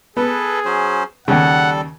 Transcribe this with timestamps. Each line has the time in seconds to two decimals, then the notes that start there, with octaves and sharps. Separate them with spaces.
0.17 B3 G#4 A4 B4
0.65 F#3 C#4 C5
1.28 D#2 C#3 G3 A4 F#5